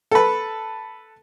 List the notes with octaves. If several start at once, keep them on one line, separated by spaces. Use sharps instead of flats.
A4 B4